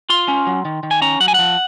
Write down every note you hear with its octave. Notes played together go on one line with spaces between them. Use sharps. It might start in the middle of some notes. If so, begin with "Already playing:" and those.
F4 C6
C#4
F#3
D#3
D#3
G#5
C#4 A#5
F#3 F#5
G#5
F3 F#5